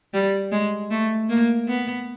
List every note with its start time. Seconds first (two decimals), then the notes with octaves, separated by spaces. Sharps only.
0.14 G3
0.52 G#3
0.90 A3
1.29 A#3
1.68 B3